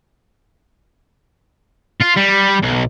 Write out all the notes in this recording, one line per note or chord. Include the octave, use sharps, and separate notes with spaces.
F4
G3
B1